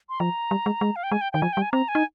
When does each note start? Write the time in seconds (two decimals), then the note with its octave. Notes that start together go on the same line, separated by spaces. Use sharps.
0.09 C6
0.20 F3 A#5
0.51 G3
0.66 G#3
0.81 G#3
0.96 F5
1.03 G5
1.12 G#3 G#5
1.21 G5
1.32 D#3 G5
1.42 F3 G#5
1.53 G3 G5
1.62 G#5
1.72 C4 A#5
1.88 G#5
1.95 D#4